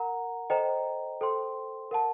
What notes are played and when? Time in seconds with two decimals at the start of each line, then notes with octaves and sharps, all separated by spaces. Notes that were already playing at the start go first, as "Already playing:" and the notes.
Already playing: A#4 F#5 A#5
0.50 A4 C5 D#5 G5 A#5
1.21 A4 C5 G5 C6
1.91 A#4 F#5 A5